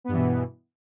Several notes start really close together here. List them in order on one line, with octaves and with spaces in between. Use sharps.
B3 G2 E3 B2